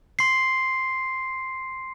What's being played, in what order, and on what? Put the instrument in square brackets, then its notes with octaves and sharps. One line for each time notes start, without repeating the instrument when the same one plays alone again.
[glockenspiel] C6 C7